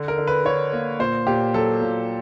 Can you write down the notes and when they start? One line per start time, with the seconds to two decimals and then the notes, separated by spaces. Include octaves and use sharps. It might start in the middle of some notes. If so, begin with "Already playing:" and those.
Already playing: D3
0.08 A#4
0.18 D3
0.27 B4
0.45 D3 C#5
0.73 A#3
0.99 A#2 C5
1.27 A#2 G4
1.54 F#3 A4
1.81 A#2